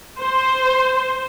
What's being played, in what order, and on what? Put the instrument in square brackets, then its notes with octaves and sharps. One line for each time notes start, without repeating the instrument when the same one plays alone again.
[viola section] C5